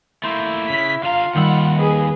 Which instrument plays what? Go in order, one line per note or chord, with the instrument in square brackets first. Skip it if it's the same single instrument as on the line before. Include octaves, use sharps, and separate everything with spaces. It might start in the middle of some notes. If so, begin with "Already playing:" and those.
[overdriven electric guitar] A3 A#3 [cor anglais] E4 [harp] C6 G6
[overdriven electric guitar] C#3 [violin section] B6
[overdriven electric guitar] D3 A#5 [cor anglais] F4 [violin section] F5
[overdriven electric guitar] D#2 B5 [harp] D#3 G3 E6 [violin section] F#5
[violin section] G#4 B4